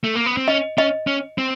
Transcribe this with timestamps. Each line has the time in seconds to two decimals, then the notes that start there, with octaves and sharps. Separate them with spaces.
0.04 A3
0.16 A#3
0.26 B3
0.37 C4
0.48 C#4 D#5
0.78 C#4 D#5
1.07 C#4
1.38 C4